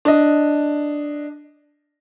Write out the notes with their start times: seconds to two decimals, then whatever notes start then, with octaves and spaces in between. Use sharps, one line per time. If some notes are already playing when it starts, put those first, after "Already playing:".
0.05 D4 D#5